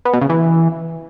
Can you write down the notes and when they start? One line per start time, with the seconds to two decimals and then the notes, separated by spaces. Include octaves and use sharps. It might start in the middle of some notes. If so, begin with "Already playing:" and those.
0.05 B3
0.13 B2
0.21 C#3
0.29 E3